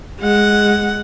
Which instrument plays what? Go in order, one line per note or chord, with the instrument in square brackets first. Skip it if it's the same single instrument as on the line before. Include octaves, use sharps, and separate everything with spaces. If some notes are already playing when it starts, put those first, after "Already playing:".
[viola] G#3 F#5